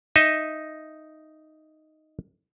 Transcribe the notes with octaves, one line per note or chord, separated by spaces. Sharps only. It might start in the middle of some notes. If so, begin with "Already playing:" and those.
D#4 D#5 E5